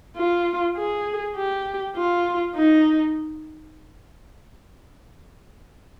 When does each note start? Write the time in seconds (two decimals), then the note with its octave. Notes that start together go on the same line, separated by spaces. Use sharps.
0.17 F4
0.77 G#4
1.36 G4
1.96 F4
2.55 D#4